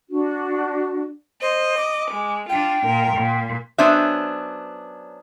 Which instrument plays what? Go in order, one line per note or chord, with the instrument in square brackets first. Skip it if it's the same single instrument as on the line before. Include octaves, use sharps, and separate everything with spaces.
[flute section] D4 F#4
[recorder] C5 [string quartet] D#5
[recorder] D6
[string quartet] G#3
[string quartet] D4 F4 [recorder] G5
[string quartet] A#2 A#4
A#2
[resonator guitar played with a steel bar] F#3 B3 C#4 D4 C5 E5